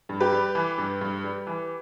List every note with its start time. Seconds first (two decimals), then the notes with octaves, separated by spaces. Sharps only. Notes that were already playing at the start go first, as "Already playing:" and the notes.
0.09 G2
0.20 G4 B4
0.32 G3
0.55 E3
0.78 G2
1.01 G2
1.24 G3
1.47 E3